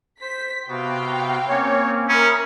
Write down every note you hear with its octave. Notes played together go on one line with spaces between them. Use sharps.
C5 B6
C3 B3 F#4 F5 G5
A#3 C4 C#4 C#5
C#4 A#4 E5 B5 D#6 F6